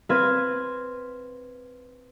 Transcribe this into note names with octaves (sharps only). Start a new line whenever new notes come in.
C4 B4 F5 G#6